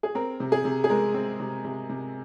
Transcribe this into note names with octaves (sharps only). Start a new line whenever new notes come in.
G#4
C4 A#4
C3
G#4
C3
G#4
G#3 A#4
C4
C3
C3
C3